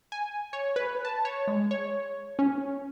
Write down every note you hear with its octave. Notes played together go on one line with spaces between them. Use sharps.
G#5
C#5
B4
A5
C#5
G#3
C#5
C#4